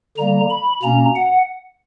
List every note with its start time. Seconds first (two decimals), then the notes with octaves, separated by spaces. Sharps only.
0.17 D3 G3 A#3 A#5
0.50 B5
0.82 B2 A#3 C#4 A#5
1.15 F#5